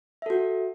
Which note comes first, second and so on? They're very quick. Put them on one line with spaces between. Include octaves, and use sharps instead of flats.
E5 A4 F#4